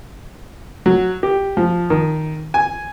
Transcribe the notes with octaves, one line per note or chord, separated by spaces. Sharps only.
F#3
G4
F3
D#3
G#5